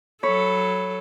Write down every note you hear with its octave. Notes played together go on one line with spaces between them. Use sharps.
F#3 A4 C#5 B5